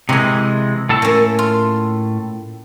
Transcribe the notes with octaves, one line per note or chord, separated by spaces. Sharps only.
C3 E3 G#3 D#5 G#5
A2 A4 A5
A#3 C#4
F4